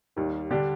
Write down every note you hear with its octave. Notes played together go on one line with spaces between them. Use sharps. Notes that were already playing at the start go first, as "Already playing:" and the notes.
D#2 D#3 G3
D3 G3 D4 G4